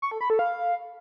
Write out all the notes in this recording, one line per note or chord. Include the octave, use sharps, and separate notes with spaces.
C#6
A4
B5
A4
F5